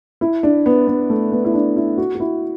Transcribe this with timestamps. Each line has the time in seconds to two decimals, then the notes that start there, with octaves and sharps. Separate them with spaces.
0.21 E4
0.43 D4
0.66 B3
0.88 B3
1.10 A3
1.32 B3
1.45 E4
1.54 D4
1.76 E4
1.98 F#4
2.15 F#4
2.20 E4